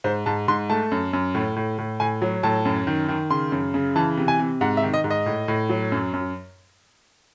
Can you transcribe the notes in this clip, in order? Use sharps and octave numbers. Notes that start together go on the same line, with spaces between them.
G#2 C5
G#2 A5
G#2 C6
A3 A5
F#2
F#2
A2
A2
A2
A2 G#5
F#3
A2 A5
F#2
D#3
D#3
C#3 C6
F#2
C#3
E3 A5
C3
G#5
C3
G#2 F#5
E5
D#3
D#5
G#2
D#5
A2
A2
F#3
F#2
F#2